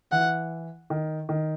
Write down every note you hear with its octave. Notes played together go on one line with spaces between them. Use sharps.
E3 F#5
D#3
D#3